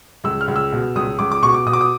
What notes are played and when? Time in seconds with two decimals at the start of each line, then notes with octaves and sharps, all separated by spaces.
0.24 C#2 E6
0.41 F6
0.48 C#2
0.56 E6
0.72 B2
0.95 C#2 D#6
1.19 C#2 D6
1.32 D6
1.42 B2 C#6
1.54 D6
1.66 B2 D#6
1.73 D6
1.81 D#6